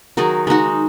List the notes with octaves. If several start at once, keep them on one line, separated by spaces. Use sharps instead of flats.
D#3 F#3 D#4 G#4
G#3 D#4 F#4